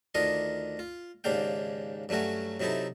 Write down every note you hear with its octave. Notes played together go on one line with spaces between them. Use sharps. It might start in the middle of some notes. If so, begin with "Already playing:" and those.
D2 D#3 D4 F4 A#4 D#5
F4
D#2 G#2 C#3 D4 F5 G5
G2 F#3 A3 C#4 F#4
C3 F#3 D#4 E4 A4